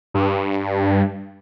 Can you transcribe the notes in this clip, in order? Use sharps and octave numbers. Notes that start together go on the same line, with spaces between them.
G2